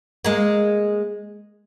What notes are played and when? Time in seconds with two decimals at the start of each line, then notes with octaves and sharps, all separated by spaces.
0.25 G#3 A#3